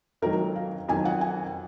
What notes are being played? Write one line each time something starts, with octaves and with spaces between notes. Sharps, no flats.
F2 D#3 F#3 A#4
F5
F2 D#3 F#3 G#5
F#5
G#5